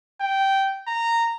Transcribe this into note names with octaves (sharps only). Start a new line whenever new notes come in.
G5
A#5